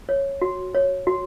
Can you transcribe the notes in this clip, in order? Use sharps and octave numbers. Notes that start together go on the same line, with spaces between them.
C#5
F#4
C#5
F#4